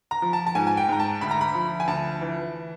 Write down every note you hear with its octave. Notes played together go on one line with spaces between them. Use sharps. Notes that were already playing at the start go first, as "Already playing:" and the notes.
A#5
F3
A5
A5
G#2 G#5
G#5
G5
G#2 A#5
A5
D2 B5
A#5
B5
F3
G#5
D2 A5
E3